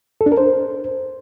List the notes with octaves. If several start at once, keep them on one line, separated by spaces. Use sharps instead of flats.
A4
D4
A#4
C5